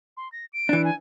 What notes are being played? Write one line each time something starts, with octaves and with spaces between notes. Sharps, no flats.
C6
A#6
D7
E3 D4
G#5